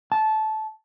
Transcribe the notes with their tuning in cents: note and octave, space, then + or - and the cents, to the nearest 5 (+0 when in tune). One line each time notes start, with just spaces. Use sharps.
A5 -15